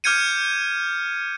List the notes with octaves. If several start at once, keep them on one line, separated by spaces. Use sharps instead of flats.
D6 F6 G6 G#6 C#7 D#7